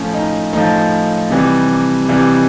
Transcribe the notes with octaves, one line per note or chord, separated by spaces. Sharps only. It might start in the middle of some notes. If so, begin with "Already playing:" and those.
Already playing: A2 F3 C#4
D#4
A2 F3 D#4
C3 E3 G3
C3 E3 G3